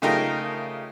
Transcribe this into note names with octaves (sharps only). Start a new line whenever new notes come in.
C#3 A3 D#4 F4 G4 A#4